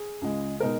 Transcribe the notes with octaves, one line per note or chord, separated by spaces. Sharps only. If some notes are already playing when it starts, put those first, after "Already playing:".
Already playing: G#4
C#2 C#3 G#3
B2 G#3 D#4 A#4